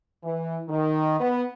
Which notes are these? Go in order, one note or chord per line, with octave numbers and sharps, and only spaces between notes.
E3
D#3
B3